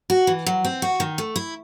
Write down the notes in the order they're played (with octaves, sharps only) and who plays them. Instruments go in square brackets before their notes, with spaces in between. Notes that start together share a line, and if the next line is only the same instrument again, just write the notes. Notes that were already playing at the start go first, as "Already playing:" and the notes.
[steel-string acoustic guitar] F#4
E3
F#3
C4
F#4
D#3
A3
E4